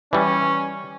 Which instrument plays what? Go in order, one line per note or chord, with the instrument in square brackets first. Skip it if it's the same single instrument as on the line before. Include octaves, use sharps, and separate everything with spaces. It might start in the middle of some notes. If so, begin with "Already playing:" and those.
[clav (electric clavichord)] E3 G3 [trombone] C#4